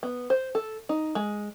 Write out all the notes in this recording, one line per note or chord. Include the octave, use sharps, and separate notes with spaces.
B3
C5
A4
D#4
G#3